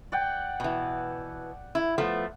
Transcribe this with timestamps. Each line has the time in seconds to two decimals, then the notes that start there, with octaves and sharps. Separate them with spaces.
0.12 D5 F#5 G5
0.60 B2 E3
1.75 E4
1.98 F3 A3 B3